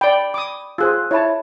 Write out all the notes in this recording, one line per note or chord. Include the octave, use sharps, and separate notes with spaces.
D5 G5 B5
D6 D#6
F4 G#4 C5 E6 F#6
E4 C#5 E5 A5 B5